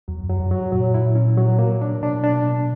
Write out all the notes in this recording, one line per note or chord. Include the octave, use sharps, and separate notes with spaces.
E2 F#3
F#2
F#3
F#2
F#3
A#2 F#3
E4
C#4
F#3
A#3
D4
B2 D4
D4